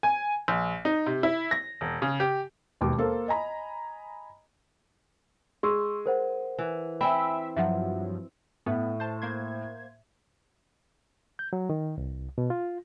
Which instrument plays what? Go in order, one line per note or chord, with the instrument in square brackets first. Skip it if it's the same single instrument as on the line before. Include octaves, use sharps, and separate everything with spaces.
[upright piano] G#5
A#1
D#4
C3
E4
A#6
E1
C#3
G4
[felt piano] E1 D#2 B2 D6
A#3 A4 C5 F5
D#5 G#5 A#5 B5
[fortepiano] G#3 [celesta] C6 C#6 E6
[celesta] A#4 C5 F#5
[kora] E3
[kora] C4 E4 [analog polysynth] E5 [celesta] G#5 B5
[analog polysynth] G2 F3 F#3 [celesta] E5 F#5
[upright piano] A2 [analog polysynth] B3
[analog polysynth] C5 A5
A#3 C5 G#6
[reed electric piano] G6
F#3
D#3
C2
B2
F4